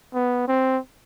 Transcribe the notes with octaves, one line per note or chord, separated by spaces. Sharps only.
B3
C4